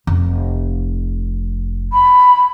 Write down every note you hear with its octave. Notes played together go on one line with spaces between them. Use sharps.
F1
B5